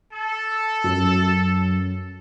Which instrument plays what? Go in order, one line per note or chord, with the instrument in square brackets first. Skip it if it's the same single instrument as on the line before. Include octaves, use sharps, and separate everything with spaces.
[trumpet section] A4
[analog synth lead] F#2